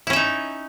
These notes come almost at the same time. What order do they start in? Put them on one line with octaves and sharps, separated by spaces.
E4 C#4 E5 D#4